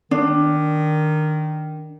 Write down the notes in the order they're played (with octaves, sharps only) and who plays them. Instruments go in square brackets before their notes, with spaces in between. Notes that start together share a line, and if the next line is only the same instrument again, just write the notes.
[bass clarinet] D#3 [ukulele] D4